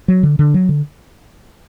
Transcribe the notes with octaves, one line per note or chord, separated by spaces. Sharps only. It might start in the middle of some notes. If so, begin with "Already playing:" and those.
F#3
D3
D3
F#3
D3